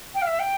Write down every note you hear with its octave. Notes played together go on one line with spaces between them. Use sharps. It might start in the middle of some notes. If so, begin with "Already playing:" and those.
G5
F5
E5
G5